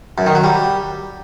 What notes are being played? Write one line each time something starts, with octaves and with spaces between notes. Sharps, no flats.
F#2
D#3
F#3
G3